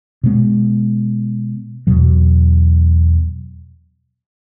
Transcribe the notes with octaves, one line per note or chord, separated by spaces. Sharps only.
B2 G#3 B3
E2 B2 F#3